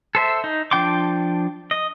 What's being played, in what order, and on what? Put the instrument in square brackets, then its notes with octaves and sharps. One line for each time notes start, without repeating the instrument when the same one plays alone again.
[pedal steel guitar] A4 C5 E5
D#4
F3 D4 G5 C6 D6
D#5